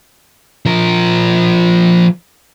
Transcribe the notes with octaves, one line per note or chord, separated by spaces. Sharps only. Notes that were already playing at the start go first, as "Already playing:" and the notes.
F3 A#4